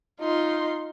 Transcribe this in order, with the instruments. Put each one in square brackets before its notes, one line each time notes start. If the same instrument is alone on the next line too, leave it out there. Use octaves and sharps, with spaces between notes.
[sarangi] D#4 [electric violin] F4 C6